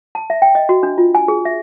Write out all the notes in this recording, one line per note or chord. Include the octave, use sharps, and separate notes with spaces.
A5
E5
G5
D#5
F#4
D4
F4
G#5
G#4
E5